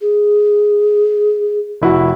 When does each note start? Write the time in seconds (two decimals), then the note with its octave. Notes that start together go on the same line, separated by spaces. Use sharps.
0.01 G#4
1.82 F1 E4 F#4